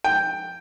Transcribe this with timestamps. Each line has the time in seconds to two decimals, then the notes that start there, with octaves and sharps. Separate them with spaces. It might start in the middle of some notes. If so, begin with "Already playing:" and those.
0.04 G5